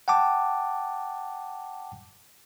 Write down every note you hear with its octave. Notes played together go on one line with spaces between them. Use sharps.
F#5 G5 A5 D6